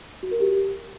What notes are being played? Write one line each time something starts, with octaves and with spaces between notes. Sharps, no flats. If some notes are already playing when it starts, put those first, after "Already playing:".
F#4
A#4
G4